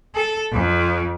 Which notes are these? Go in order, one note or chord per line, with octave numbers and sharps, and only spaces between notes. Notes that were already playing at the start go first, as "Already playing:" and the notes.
A4
F2